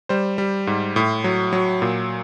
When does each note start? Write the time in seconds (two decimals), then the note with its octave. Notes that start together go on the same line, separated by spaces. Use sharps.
0.09 G3 C5
0.38 G3
0.67 G#2
0.96 A2
1.24 F#3
1.53 F#3
1.82 A#2